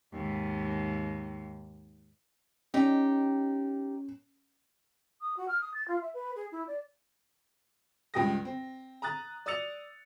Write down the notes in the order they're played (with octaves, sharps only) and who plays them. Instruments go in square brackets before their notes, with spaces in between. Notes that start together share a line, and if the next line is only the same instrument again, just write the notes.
[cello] D#2 G#2
[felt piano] C#4 [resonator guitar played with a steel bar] D#4 G4
[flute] D#6
F#4
F6
D#6
A6
F4
E5
B4
G#4
E4
D5
[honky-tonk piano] C#2 G2 G5 D#6 A#6
C4
A#5 D#6 F#6 A6
D5 D#6 E6 A6 C#7 F7